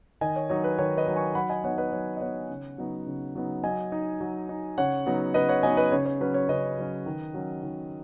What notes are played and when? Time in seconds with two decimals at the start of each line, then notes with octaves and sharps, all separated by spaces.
0.21 D#3 D#5 G#5
0.36 C#5
0.50 F#3 D#4 C#5
0.64 B4
0.78 D#3 C#5
0.97 B4 D#5
1.07 F#3 D#4
1.16 G#5 C#6
1.35 F#3 F#5 B5
1.49 D#5 G#5
1.64 B3 D#4 C#5 F#5
1.78 B4 D#5
1.93 F#3 C#5
2.17 D#5
2.21 B3 D#4 C#5 F#5
2.49 C#3
2.78 F#3 B3 D#4
3.06 C#3
3.35 F#3 B3 D#4
3.63 F#3 D#5 G#5
3.92 D#4
4.20 F#3
4.49 D#4
4.77 C#3 C#5 F#5
5.06 F#3 B3 D#4
5.34 C#3 B4 D#5
5.49 C#5 F#5
5.63 F#3 B3 D#4 D#5 G#5
5.77 B4 D#5
5.92 C#3 C#5
6.06 C#5
6.20 F#3 C#4 B4
6.34 C#5
6.49 C#3 B4 D#5
6.78 F#3 C#4
7.06 D#3
7.34 F#3 C#4
7.63 D#3